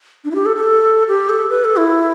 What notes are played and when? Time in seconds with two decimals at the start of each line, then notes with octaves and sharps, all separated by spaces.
0.25 D4
0.31 E4
0.35 G4
0.46 A4
0.56 A4
1.08 G4
1.29 A4
1.50 B4
1.64 A4
1.78 E4